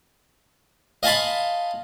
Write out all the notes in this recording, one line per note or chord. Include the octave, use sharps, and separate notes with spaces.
D#5 F5 G#5 A5 B5 C6